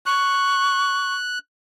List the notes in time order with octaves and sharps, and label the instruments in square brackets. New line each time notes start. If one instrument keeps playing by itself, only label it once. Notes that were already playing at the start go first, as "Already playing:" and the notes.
[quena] C#6 [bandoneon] F#6